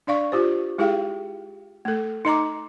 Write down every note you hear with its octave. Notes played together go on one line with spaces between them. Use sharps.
D4 D5 F5 C#6
F4 G4 C5
G#3 E4 G4 G#4 F5 G5
A3 A4
D#4 D#5 A#5 D6